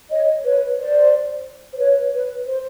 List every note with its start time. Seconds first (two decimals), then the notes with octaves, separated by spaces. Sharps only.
0.11 C#5 D#5
0.44 B4 C#5
0.78 C5 D5
1.73 C5
1.79 B4 C#5
2.13 B4 C#5
2.46 C5